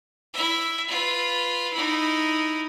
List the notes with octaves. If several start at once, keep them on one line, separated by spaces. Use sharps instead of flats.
E4 E5
F4 B4
D#4 E4